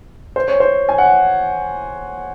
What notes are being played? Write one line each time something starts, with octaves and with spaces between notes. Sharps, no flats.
C5
C#5
C5
G#5
F#5